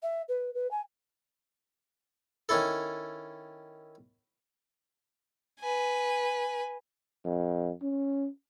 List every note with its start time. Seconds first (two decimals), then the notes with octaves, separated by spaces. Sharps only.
0.02 E5
0.28 B4
0.54 B4
0.70 G#5
2.49 D#3 C#4 E4 A4
5.60 B4 G#5
7.25 F2
7.82 C#4